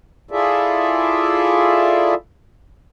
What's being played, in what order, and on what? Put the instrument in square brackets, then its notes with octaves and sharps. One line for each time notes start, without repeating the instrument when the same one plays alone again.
[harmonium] E4 F4 G#4 A4 D5 E5